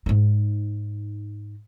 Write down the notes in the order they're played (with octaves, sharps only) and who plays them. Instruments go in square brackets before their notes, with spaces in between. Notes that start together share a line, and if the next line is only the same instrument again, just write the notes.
[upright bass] G#2 D#4